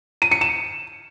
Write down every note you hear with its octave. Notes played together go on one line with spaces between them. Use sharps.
D#7
C#7
E7